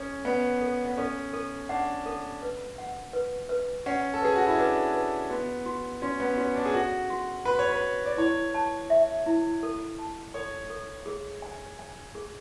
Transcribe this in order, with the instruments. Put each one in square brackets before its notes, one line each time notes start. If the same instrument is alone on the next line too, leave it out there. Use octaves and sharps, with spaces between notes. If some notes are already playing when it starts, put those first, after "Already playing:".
Already playing: [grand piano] C#4 [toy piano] A4
[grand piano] B3 [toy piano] D5
[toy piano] A4
[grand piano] B3
[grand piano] C#4 [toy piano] A4
[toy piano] A4
[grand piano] D4 [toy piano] F#5
[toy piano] A4
B4
F#5
B4
B4
[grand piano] C#4 [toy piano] F#5
[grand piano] A4
[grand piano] G#4 [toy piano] B4
[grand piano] F#4
E4
[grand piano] D4 [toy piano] B4
[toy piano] B4
[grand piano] B3 [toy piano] F#4
[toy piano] F#4
[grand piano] C#4 [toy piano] F#4
[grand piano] B3
[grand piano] C#4 [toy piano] F#4
[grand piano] D4
G#4
[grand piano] F#4 [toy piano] A4
[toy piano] F#4
[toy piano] F#4 [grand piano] B4
[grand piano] C#5
B4
[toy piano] C#5
[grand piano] D5
[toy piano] E4 [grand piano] C#5
[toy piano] A5
E5
E4
A4
A5
[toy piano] A4 [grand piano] C#5
[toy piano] A4
G#4
G#5
G#5
G#4